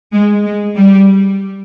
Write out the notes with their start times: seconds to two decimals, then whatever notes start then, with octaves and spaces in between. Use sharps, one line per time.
0.13 G#3
0.45 G#3
0.77 G3